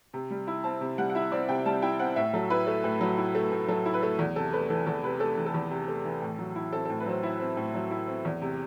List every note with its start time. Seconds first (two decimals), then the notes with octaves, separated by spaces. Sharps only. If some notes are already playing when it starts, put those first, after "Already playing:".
0.14 C3
0.31 G3
0.47 E4
0.64 C4 A5
0.81 C3
0.98 G3 F#5
1.10 F#5
1.15 E4 E5
1.32 C4 D5
1.49 C3 G5
1.65 G3 A5
1.82 E4 G5
1.99 C4 F#5
2.16 A2 E5
2.33 F#3 A4
2.50 E4 B4
2.67 A3
2.84 A2
3.01 F#3
3.18 E4
3.35 A3
3.52 A2
3.68 F#3 A4
3.86 E4
3.94 B4
4.02 A3
4.19 E2
4.36 C3 A4
4.53 A3 B4
4.70 E3 A4
4.87 E2 A4
5.03 C3 B4
5.20 A3 A4
5.37 E3
5.46 A4
5.54 E2
5.71 C3
5.88 A3
6.05 E3
6.22 A2
6.39 F#3
6.56 E4
6.72 C4 A4
6.85 A2 A4
7.00 B4
7.06 F#3 C5
7.23 E4 E5
7.40 C4
7.57 A2
7.74 F#3
7.91 E4
8.07 C4
8.25 E2
8.42 C3